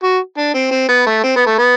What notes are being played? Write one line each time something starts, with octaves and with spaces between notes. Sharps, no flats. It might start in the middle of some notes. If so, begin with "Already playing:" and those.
F#4
D4
C4
C4
B3
A3
C4
B3
A3
B3